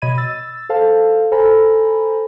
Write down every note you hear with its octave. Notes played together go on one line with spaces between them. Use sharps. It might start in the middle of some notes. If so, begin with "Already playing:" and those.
B2 C#5 D#5 B5 G#6 D#7
E6 A6
A4 C5 F5 A5
A4 C5 G#5 A#5 B5